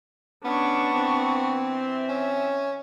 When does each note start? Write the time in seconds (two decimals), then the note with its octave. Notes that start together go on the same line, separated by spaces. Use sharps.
0.45 B3 C#4 D4 C#6
0.94 E3 C4
1.71 E5
2.09 C#4